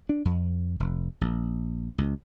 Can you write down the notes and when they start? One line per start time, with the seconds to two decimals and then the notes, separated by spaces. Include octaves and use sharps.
0.09 D4
0.25 F2
0.80 F1
1.21 A#1
1.98 C#2